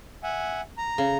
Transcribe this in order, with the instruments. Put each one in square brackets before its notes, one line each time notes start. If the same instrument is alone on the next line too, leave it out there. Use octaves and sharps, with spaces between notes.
[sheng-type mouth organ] E5 F#5 G#5
A#5
[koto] C#3